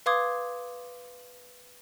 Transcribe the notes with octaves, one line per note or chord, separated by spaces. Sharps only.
B4 F5 C6 D6 D#6 G#6